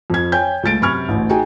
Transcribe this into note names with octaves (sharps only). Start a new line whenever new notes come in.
F2 G#6
C#5 G5 G#5 G6
C#2 A3 A6 D7
F#2 C3 B5 C#6 F6 G#6
A1 D2
D#4 F#4 G#4 G5 G#5